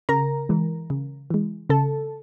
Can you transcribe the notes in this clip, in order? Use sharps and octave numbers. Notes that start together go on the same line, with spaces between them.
C#3 A#4 A#5
E3 G#3
C#3
E3 G#3
C#3 A4 A5